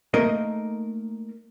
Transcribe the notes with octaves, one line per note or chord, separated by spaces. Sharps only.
A3 A#3 D#4 A#4 D#5